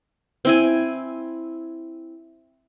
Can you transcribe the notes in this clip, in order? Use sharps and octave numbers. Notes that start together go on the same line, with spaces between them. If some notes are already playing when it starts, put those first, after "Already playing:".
C4 E4 G#5